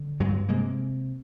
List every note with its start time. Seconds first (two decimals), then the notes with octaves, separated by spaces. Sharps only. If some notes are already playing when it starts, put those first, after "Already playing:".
Already playing: D3
0.20 G2 F#3 G#3
0.49 C3 G#3 A#3